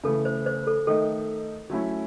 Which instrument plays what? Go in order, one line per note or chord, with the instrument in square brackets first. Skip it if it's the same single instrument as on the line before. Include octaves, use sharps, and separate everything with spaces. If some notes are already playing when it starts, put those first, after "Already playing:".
[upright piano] C#3 E3 A3 [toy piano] A4
[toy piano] C5
C5
A4
[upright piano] D#3 A3 D#4 [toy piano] A4
[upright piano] F#3 A3 C#4 E4